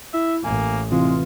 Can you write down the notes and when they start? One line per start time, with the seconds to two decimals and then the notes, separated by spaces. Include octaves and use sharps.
0.14 E4 E5
0.44 A1 A#3 G#5
0.91 C3 E3 G#3 C4 F4